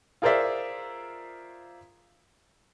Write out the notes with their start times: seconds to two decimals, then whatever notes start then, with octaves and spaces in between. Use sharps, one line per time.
0.22 F4 G#4 A#4 C5 D5 E5